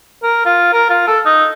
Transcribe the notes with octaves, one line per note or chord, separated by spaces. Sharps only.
A#4
F4
A#4
F4
A4
D#4